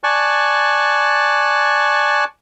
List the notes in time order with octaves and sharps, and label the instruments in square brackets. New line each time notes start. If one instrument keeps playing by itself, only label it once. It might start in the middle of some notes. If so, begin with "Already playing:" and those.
[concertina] D5 G#5 A5 C#6 F#6